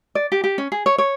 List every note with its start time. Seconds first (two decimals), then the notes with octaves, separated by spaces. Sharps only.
0.15 D5
0.32 G4
0.44 G4
0.58 C#4
0.72 G#4
0.86 C#5
0.98 C#5